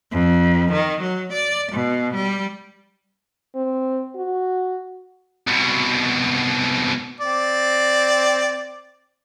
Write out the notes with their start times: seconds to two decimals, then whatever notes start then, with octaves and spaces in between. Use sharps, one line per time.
0.12 F2
0.72 D#3
1.02 F#3
1.33 D5
1.72 B2
2.15 G3
3.56 C4
4.16 F#4
5.47 C2 B2
7.20 C4 D5